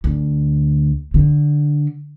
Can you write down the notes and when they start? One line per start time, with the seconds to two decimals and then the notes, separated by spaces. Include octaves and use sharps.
0.04 D2
1.14 D3